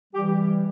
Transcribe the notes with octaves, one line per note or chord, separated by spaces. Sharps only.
E3 G3 G4